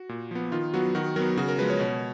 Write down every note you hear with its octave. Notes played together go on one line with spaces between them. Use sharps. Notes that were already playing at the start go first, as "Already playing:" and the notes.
Already playing: F#4
A#2
F3 B3
D#3 F4
F#3 B3 F#4
D#3 F#4
F#3 B3 A#4
C#3 F#4
A#4
F3 G#3 B4
C#5
B2